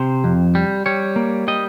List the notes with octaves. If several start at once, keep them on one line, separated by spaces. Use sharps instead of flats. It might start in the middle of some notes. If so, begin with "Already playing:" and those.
Already playing: C3 C5
F2
G3
G3 C#5
A#3
G3 D#5